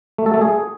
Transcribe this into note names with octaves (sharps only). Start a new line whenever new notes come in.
A3
A4
A3
G#4